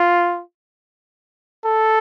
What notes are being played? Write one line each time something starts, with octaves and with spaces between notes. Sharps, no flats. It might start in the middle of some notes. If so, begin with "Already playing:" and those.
Already playing: F4
A4